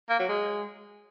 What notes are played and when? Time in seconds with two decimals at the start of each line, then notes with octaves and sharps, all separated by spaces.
0.10 A#3
0.19 F#3
0.29 G#3